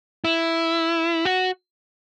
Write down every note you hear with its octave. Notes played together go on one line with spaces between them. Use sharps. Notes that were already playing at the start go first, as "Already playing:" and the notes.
E4
F#4